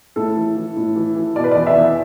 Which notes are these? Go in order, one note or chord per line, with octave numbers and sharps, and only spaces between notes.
A2 A4
E3
E3
A2
E3
E3
B2 D5
B4
E2 D5
E5
E2